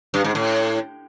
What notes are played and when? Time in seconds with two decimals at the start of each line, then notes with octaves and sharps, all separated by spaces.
0.14 G2
0.24 G#2
0.35 A2